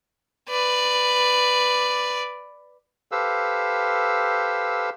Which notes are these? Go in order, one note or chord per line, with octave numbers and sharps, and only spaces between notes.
B4 D5
G4 A4 B4 C5 F5 E6